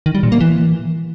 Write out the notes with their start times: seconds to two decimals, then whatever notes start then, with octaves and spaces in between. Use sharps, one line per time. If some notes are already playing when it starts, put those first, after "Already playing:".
0.06 D#3
0.15 G3
0.23 A#2
0.32 A#3
0.41 E3